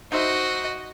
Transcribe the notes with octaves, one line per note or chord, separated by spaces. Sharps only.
D#4 F#4 C5 D#5 E5